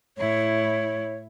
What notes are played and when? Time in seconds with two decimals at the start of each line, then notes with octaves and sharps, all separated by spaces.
0.18 A2 E4 C#5